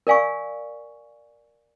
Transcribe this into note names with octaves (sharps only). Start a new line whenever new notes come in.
A#4 D5 F5 G#5 C#6